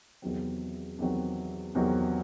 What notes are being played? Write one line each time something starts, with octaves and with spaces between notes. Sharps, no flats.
E2 C3 D#3 F#3 C4
E2 C3 D#3 F#3 C4
E2 C3 D#3 F#3 C4